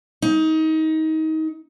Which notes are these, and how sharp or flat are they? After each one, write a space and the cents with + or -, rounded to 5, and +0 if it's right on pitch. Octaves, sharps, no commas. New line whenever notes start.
D#4 +25